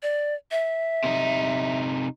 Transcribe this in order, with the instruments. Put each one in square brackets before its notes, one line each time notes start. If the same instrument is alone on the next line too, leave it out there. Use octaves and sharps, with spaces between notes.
[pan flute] D5
E5
[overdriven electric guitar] C3 D#4